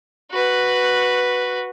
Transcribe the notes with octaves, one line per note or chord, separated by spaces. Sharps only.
F#4 B4